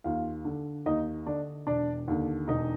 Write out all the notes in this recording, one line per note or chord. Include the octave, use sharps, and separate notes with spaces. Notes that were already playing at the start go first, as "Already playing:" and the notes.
D#2 F4 F5
D3
D#2 D#4 D#5
D3 D4 D5
E1 D4 D5
D#2 D3
E1 D#4 D#5